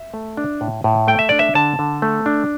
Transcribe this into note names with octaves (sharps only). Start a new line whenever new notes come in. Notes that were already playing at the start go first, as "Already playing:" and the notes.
Already playing: E5
A3
D4
A2
A2
A3 G5
E5
D4 D5
E5
D3 A5
D3
A3
D4